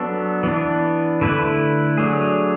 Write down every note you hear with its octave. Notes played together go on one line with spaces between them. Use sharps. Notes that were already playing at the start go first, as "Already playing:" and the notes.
Already playing: F#3 B3 D4 A4
E3 B3 D4
D3 A3 E4 B4
F#3 A3 D4 G#4